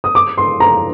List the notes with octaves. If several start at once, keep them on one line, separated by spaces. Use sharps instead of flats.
D#6
D6
C6
A#5